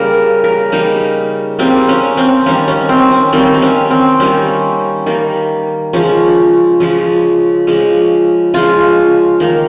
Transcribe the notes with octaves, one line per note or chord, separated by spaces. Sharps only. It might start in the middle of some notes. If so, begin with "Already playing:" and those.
Already playing: C#3 G3 A#3 A#4
A#4
C#3 G3 A#3 D#4
C#3 G3 A#3 C4
C#4
C4
D#3 G3 A#3 C#4
C#4
C4
C#4
D#3 G3 A#3 C4
C4
C#4
C4
D#3 G3 A#3 C#4
D#3 G3 A#3
C#3 F3 G#3 C#4
C#3 F3 G#3
C#3 F3 G#3
C#3 F3 G#3 F4
D#3 A#3